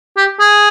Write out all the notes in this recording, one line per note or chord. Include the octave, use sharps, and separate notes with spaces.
G4
G#4